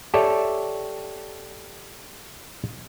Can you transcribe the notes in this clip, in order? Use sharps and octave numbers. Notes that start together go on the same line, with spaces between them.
G4 A4 C#5 D5 E5 G5